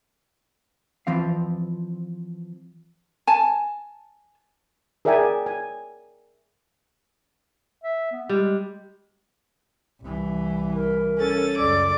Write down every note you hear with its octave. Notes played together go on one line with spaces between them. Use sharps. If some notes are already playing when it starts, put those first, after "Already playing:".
E3 F3 C4 F5
G#5 A5
G#4 A#4 D5 E5 G5 G#5
G#5
E5
B3
G3 G#3
C2 E3
A#4
C#4 A4 A6
C#2 F#2 D5 D6